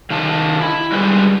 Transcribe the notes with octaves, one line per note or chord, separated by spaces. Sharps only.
D#3 F5 A5
E4
G3 G#3 F#4 G4 B4